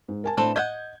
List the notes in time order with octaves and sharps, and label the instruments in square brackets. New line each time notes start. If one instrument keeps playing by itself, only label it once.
[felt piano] G#2
A#4 G#5 A5
[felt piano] A2 D4 C5 [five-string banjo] C4 A4 B4
[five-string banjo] D#5 E5 F#5 [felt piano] G6 G#6